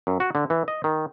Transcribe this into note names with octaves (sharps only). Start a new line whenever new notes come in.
F#2
F#4
D3
E3
D#5
D#3